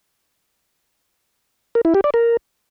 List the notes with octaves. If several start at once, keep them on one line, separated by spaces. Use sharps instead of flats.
A#4
E4
G4
D5
A#4